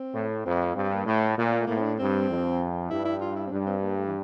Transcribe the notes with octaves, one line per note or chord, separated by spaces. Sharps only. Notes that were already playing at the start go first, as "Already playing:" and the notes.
Already playing: C4
A2
F2 C4
G2
A#3
A2 A3
A#2
A#3
A3
A2 A#3
C4
D4
G2 C4
F2
G2 E4
E4
F4
E4
C4
G2 D4
C4
A#3
A3
E3